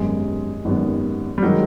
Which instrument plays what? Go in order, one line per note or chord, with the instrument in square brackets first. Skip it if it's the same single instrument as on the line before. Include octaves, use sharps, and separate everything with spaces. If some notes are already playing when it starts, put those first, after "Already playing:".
Already playing: [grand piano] G#1 F#2 D#3 G3 B3 [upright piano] G#3
[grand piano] G#1 F#2 D#3 G3 B3
[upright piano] G3
[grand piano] D#3 G#3 [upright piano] F#3